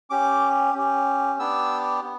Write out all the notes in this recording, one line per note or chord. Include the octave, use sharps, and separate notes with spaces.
C#4 G4 D6
C#4 G4
B3 D4 G4 E6
B3